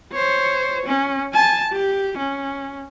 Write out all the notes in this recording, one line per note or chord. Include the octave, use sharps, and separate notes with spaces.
C5 C#5
C#4
G#5 A5
G4
C#4